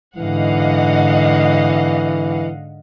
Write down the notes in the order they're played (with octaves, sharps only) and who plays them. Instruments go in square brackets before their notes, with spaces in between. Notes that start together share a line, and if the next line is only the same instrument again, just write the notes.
[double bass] G#2 D3 [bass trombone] E3 [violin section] D#5 F5 F#5